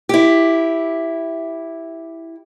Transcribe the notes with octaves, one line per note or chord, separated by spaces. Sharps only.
E4 G4